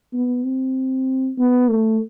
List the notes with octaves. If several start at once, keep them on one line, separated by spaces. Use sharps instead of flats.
B3
C4
B3
A3